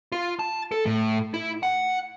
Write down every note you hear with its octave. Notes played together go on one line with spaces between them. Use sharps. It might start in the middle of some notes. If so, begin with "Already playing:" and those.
F4
A5
A4
A2
E4
F#5